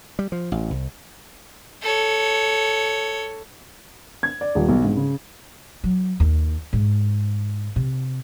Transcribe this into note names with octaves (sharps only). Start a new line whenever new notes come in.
G3
F3
A1
C2
A4 C#5
G#6
D5
D#1
B1
G#2
C#3
F#3
D#2
G#2
C3